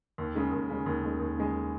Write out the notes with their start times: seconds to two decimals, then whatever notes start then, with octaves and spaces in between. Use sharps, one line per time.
0.18 D#2
0.36 C#3 G#3
0.52 D#2
0.69 C#3 G#3
0.86 D#2
1.03 C#3 G#3
1.20 D#2
1.37 C#3 G#3